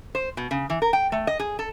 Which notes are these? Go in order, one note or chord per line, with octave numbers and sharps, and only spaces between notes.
C5
B2
C#3
E3
A#4
G5
A3
D#5
G#4
A4